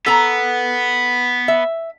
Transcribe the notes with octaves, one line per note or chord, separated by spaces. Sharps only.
B3 A4 A#5
E5